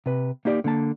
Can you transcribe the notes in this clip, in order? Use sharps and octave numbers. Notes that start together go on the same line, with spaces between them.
C3 B4
A#3 D#4 G4 D5
D3 A#3 A5